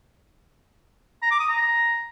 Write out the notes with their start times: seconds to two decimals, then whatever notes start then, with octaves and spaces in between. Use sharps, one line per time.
1.22 A#5
1.31 D6
1.40 D#6
1.49 A#5